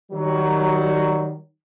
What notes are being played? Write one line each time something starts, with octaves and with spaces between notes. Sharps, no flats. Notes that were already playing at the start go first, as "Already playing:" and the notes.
D#3 F#3 G3